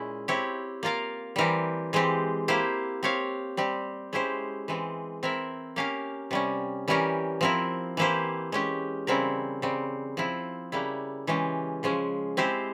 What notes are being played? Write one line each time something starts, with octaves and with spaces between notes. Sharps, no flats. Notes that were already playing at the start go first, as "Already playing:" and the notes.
Already playing: A#2 G#3 C#4 E4
C4 E4 G4 C#5
A#3 F4 A#4 F5
E3 G3 C4 G4 A#4
E3 G#3 C4 G4
A#3 E4 G4 C5
C4 G4 C#5 F5
G3 C4 G4
G#3 C#4 E4 G4 C5
E3 G#3 C4
C4 E4 A#4 E5
A#3 C#4 G4 A#4 F5
C3 G3 C#4
E3 G3 C#4 G4 A#4
F3 C4 E4 A#4
E3 A#3 E4 G4 C5
G#3 C#4 G4
C#3 G3 C4 E4 A#4
C#3 G3 C4
F3 C4 E4
C#3 G3 A#3 E4
E3 G#3 C#4 G4
C#3 F3 G#3 C#4
G#3 C4 E4 G4 C5